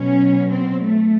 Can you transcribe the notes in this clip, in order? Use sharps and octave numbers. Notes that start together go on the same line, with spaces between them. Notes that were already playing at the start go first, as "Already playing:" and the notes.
Already playing: B2 F#3 C#4
C4
A3